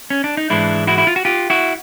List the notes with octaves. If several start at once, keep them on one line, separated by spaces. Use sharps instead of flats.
C#4
D4
D#4
G#2 E3 G#3 D4 E4
E4 F#4
E4
F4
F#4
F4 G4
E4 F#4